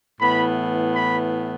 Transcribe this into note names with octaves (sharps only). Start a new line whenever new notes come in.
A2 E3 B3 B5
B5